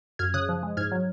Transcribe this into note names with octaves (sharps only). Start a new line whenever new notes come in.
F#2 F6 G#6
C#3 D#6 F#6
F3
G#3
G#2 F6 G#6
F#3